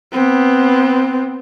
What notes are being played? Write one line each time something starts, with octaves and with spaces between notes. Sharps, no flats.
B3 C4